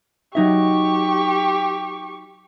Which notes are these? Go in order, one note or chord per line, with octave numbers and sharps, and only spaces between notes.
F#3 D#4 G4 E5 C#6